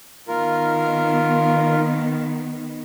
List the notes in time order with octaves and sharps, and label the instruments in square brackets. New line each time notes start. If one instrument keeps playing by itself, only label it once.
[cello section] D#3 B3 [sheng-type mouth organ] F4 A#4